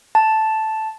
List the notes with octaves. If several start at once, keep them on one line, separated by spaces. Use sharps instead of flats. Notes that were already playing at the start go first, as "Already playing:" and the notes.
A5